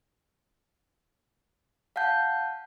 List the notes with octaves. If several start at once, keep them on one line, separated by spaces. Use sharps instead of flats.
F5 F#5 A5 G6